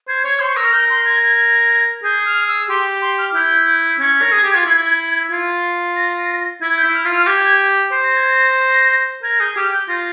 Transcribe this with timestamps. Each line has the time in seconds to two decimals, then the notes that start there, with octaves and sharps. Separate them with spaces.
0.08 C5 G#6
0.24 C#5
0.39 C5 C6
0.48 C#6
0.57 A#4 E6
0.65 F6
0.73 A#4 G6
0.90 C6
1.05 G#6
1.23 G#6
2.04 G#4 G6
2.26 F6
2.48 E6
2.69 G4 C6
3.02 C6
3.18 F6
3.34 E4 G6
4.00 C#4 G#6
4.21 A#4
4.32 G#4
4.44 G4
4.55 F4
4.66 E4
5.31 F4
5.96 A#6
6.61 E4 G#6
6.77 G6
6.84 E4
6.94 F6
7.05 F4
7.11 F6
7.27 G4 G#6
7.44 G#6
7.92 C5
8.04 A#6
8.17 G#6
8.29 A#6
9.23 A#4 G#6
9.39 G#4 G6
9.56 G4 F6
9.73 G6
9.88 F4 A#6